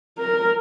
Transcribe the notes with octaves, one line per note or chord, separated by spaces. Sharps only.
A#4